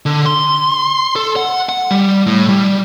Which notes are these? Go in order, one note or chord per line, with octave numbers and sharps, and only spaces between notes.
D3
C6
A4
F#5
F#5
G3
A2
G3